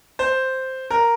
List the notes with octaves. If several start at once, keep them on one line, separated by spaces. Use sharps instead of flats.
C5
A#4